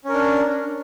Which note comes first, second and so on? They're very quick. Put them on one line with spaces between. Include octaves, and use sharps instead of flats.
C#4 A#4 D4